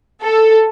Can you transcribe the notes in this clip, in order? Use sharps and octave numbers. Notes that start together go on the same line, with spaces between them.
A4